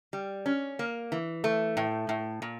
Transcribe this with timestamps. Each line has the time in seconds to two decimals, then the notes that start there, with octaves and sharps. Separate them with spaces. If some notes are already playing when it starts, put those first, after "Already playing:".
0.13 G3
0.46 C#4
0.79 A#3
1.12 E3
1.44 A3
1.77 A2
2.09 A2
2.42 A#2